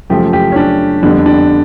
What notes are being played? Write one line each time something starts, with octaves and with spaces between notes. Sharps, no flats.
F#2 C#3 F3 A3 G4
G4
C#4
D4
F2 D3 G3 B3 D4
D4